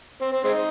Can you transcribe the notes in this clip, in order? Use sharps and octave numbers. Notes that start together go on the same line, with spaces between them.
C4
C4
G#3 C4 D#4